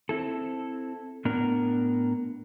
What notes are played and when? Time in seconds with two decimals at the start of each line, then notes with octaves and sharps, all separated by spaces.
0.09 C4 E4 A4
1.25 A2 B3 D4 A#4